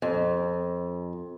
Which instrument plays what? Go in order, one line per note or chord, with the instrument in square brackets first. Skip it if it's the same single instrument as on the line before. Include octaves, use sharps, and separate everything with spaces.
[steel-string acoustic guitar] F2